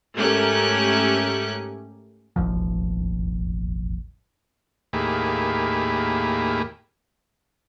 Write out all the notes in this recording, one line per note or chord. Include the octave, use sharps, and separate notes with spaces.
G#2 A3 C#4 G4 A#4 F#6
E1 A1 D#2 F3
D#2 A2 A#3 G4 G#4 B5